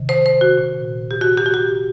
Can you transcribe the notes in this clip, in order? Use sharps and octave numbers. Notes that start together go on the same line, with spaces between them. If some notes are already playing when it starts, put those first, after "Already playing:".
Already playing: C3 D#3
C5
C5
F#4
A#2
G4
F#4
G4
F#4
G4